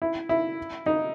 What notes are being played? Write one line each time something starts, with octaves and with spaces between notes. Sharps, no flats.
E4
E4
D#4